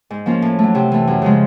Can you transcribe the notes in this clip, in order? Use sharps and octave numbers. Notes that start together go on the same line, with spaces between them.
G#2
F3 A#3 C#4 F4
A2
F#3 A3
C3
E3 A3
F#2
C#3 F3 G#3